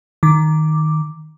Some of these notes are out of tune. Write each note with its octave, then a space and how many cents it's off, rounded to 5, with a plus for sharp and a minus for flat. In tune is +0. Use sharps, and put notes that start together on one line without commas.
D#3 +0 D6 +0